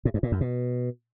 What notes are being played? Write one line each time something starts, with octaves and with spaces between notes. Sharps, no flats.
A2
G2
A#2
F#2
B2